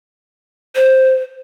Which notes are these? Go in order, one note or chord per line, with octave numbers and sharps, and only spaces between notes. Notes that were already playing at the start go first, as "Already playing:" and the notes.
C5